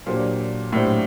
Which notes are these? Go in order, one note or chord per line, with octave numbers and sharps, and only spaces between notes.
A#2 F#3 A#3 D4 G4 C5
A2 F#3 A#3 D4 G4 C5